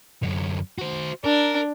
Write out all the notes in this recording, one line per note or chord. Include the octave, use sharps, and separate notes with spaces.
F#2 D3
F#4 C5
D4 A#4